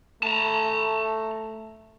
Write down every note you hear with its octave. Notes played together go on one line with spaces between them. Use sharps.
A3 A5 A#5